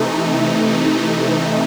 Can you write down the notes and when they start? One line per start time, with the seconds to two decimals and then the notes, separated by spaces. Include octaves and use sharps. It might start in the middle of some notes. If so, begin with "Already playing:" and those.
Already playing: C3 E3 A3 D#4